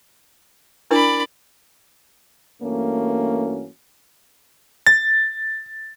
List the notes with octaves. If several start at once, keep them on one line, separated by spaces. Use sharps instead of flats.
D4 E4 A#4 D5 B5
G2 E3 A3 A#3 C#4 F#4
A6